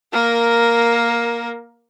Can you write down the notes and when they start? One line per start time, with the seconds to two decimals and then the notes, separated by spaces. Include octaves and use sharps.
0.13 A#3 A#4